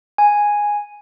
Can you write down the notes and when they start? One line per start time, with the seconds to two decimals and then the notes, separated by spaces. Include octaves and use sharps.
0.18 G#5